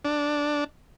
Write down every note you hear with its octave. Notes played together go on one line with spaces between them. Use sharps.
D4